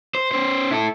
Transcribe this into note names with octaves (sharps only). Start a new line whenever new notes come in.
C5
C#4 C5
E4 A4